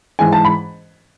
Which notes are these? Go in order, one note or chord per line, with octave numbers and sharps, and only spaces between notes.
G#2 E3 G#3 G#5
A5
B5